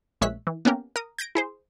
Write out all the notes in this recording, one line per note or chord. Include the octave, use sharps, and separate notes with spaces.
A#1 G#3 C#5 E5 F#6 B6
E3
A#3 B3 C#4 G4 A#4
A#4 D#6
G6 G#6 A#6 D7
E4 G#4 C5